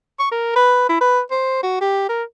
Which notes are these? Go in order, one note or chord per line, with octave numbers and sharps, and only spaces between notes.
C#6
A#4
B4
E4
B4
C5
F#4
G4
A#4